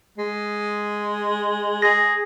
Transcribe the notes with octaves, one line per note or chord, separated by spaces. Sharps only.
G#3
G#4 A#6